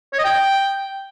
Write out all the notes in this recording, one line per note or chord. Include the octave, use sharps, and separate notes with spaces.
C#5
D#5
G5